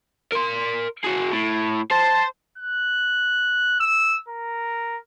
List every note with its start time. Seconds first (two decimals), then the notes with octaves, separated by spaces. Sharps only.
0.32 A#4 C6
1.04 F#4 G#4
1.32 A2
1.91 C5 A5
2.58 F#6
3.80 E6
4.28 A#4